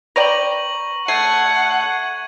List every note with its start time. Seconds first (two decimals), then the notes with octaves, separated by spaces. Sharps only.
0.16 B4 D5 G5 A#5 C#6 F#7
1.08 A3 F#5 G#6 C7 D#7